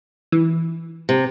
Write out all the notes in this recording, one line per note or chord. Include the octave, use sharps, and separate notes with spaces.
E3
C3